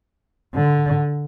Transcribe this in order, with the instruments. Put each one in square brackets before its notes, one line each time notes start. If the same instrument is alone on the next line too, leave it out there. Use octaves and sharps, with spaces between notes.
[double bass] D3